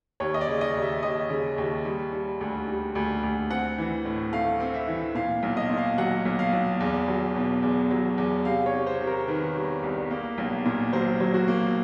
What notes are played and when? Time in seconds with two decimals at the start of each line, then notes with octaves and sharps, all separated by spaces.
0.20 D#2 C#5
0.34 D#5
0.41 D5
0.48 C#3
0.61 D#5
0.75 D#2
0.82 E5
1.03 D#2 D#5
1.30 C#3
1.58 D#2
1.85 G3
2.13 G3
2.41 D2
2.68 G3
2.95 D2
3.23 D2
3.50 C4 F#5
3.78 E3
4.05 A2
4.33 A3 F5
4.60 C4
4.74 E5
4.88 E3
5.15 A#2 F5
5.43 B1
5.57 D#5
5.70 A#2
5.77 F5
5.98 F#3 F#5
6.25 B1
6.39 F5
6.52 B1
6.80 E2
7.08 F#3
7.35 B2
7.63 E2
7.91 F#3
8.18 E2
8.45 C3 F5
8.66 C#5
8.73 C3
8.87 C5
9.01 C3
9.07 A#4
9.28 D#3 B4
9.56 G3
9.83 C2
10.11 A#3
10.38 B1
10.65 A#2
10.93 F#3 C5
11.20 F#3
11.34 F#4
11.48 A#3